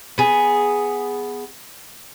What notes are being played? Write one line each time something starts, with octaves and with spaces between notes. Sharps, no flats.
B3 G#4